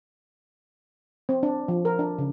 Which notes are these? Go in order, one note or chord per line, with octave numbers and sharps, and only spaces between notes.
C4
D4
F3
A#4
D4
C#3